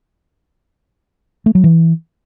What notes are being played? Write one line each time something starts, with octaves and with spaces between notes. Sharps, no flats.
A3
F#3
E3